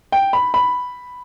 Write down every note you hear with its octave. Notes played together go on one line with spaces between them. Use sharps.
G5
B5
B5